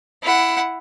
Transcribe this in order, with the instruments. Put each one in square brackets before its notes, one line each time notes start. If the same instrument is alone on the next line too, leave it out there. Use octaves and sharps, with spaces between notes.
[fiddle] E4 F#5